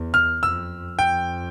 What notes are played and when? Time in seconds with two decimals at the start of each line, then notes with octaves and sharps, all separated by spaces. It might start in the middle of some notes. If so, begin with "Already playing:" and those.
Already playing: E2
0.14 F6
0.42 F2 E6
0.98 F2 G5